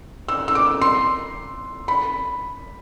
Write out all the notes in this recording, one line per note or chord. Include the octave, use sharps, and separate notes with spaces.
E6
E6
D6
C6
B5